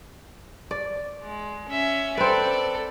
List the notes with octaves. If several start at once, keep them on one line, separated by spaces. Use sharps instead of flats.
D5
G#3
C#4 E5
C4 A4 B4 D5